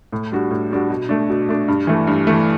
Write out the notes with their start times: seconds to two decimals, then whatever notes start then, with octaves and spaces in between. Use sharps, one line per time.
0.13 A2
0.32 G3 D4 F#4
0.51 A2
0.71 G3 D4 F#4
0.90 B2
1.09 A3 D4
1.30 B2
1.49 A3 D4
1.68 G2
1.87 E3 A3
2.07 G2
2.27 E3 A3